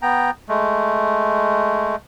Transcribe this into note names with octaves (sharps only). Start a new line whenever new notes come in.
B3 G5 A#5
G#3 A3